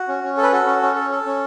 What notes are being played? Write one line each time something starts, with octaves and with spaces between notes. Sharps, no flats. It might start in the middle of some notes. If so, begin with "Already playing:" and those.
Already playing: F#4
C#4
C#4
A4
B4
F#4 A4
C#4
C#4
A4
A4
C#4